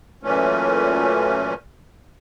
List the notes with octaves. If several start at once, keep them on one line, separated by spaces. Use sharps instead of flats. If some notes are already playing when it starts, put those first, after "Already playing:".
F#2 A#2 E3 A3 C#4